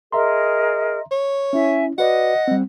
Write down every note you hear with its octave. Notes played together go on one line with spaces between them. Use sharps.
G#4 A#4 D#5 E5 A#5 C6
C#5
C#4 E4 E5 G#5
F#4 B4 D5 D#5 F#5
G3 C4